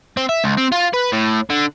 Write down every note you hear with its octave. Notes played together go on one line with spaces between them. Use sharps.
C4
E5
C#2
C4
F4
B4
A2
D3